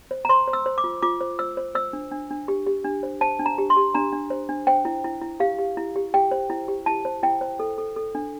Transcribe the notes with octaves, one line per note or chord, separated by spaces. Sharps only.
C5
A#5
C5 C6
C5
E6
C5
D6
F4
F4 D6
C5
C5 E6
C5
C5 E6
D4
D4
D4
G4
G4
D4
C5
C5 A5
D4
A#5
G4
C6
G4
D4 A#5
D4
C5
D4
C5 G5
E4
E4
E4
G4 F5
G4
E4
G4
G4 G5
C5
E4
G4
E4 A5
C5
E4 G5
C5
A4
A4
A4
D4